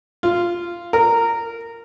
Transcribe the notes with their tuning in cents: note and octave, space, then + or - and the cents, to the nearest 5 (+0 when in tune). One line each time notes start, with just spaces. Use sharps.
F4 -15
A#4 -15